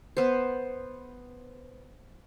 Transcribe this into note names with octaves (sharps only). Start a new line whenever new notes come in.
B3 C5